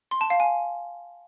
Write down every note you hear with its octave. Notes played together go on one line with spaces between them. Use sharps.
C6
A5
F5
G#5